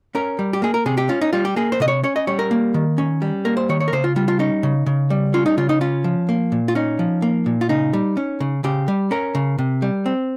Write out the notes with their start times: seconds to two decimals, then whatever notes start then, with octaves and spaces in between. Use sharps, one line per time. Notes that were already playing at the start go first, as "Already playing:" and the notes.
0.15 C#4 A#4
0.39 G3
0.53 G4
0.62 A#3 G#4
0.74 A#4
0.86 C3 G#4
0.98 G4
1.09 C#4 F4
1.21 D#4
1.33 G3 F4
1.45 G4
1.56 A#3 G#4
1.72 C5
1.80 C3 D#5
1.88 C#5
2.03 C#4 C#5
2.16 D#5
2.27 G3 C#5
2.39 A#4
2.51 A#3
2.74 D#3
2.98 C#4
3.22 G3
3.45 A#3 A#4
3.57 C5
3.69 D#3 C#5
3.80 C#5
3.88 A#4
3.93 C#3 C5
4.04 F4
4.16 G3 F4
4.28 F4
4.39 C#4 D#4
4.63 C#3
4.86 C#3
5.10 G3
5.34 C#4 F4
5.46 D#4
5.57 C#3 F4
5.69 D#4
5.81 C#4 F4
6.04 F3
6.29 A#3
6.52 A#2
6.68 F4
6.75 C#4 D#4
6.99 F3
7.22 A#3
7.46 A#2
7.61 F4
7.69 C#3 D#4
7.93 G3
8.17 C#4
8.40 C#3
8.64 C#3 G4
8.88 G3
9.11 C#4 A#4
9.35 C#3
9.58 C3
9.82 G3
10.06 C4